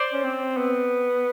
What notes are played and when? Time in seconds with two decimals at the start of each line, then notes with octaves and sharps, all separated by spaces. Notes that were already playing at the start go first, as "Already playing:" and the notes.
Already playing: C5 D5
0.13 C#4
0.24 C4
0.57 B3